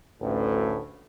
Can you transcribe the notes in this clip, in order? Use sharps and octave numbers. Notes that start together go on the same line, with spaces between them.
A1 D2 A2